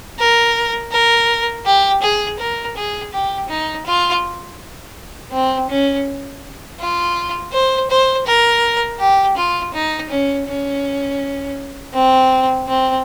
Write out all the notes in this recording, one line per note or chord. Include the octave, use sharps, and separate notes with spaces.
A#4
A#4
G4
G#4
A#4
G#4
G4
D#4
F4
C4
C#4
F4
C5
C5
A#4
G4
F4
D#4
C#4
C#4
C4
C4